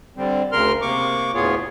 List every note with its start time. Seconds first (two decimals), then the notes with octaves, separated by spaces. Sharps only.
0.17 D3 G3 C4
0.52 D2 C#3 A#4 C6 F6
0.82 C3 A#3 C#6 D6
1.34 D2 A2 B3 F4 G#4 C#5